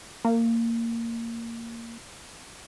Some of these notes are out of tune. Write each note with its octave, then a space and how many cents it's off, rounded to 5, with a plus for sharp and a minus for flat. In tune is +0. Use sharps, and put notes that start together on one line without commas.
A#3 -15